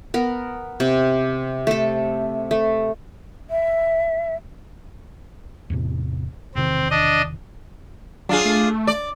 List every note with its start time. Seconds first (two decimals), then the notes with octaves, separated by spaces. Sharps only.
0.14 B3 A#4
0.80 C3
1.67 A3 A4
2.51 A3
3.50 E5
5.70 E2 A2 C3
6.55 E1 C3 D#3 C4
6.91 D4 D#5
8.29 F#3 D4 F4 G#4
8.45 A3
8.87 D5